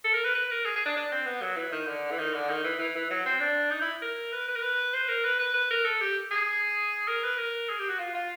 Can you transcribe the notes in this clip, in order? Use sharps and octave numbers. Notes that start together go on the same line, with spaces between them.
A4
A#4
B4
B4
A#4
G#4
G#4
D4
D4
C4
B3
F#3
E3
D#3
D3
E3
D#3
D3
D#3
E3
E3
E3
F#3
C4
D4
D#4
E4
A#4
B4
B4
A#4
B4
C5
A#4
B4
B4
B4
A#4
A4
G4
G#4
A#4
B4
A#4
G#4
G4
F#4
F4
F4